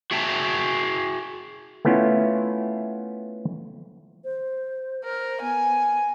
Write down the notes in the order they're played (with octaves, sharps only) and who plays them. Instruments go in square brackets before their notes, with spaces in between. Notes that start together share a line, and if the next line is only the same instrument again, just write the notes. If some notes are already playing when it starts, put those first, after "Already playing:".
[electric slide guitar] F#4 G#4 E5 G5 A5
[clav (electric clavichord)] A3 B3 C#4 E4 F4
[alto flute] C5
[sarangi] A#4 [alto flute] C5
[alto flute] B3 [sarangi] G#5